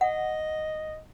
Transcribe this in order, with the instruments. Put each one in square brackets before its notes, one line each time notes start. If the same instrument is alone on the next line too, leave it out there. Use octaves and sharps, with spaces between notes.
[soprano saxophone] D#5 [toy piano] F#5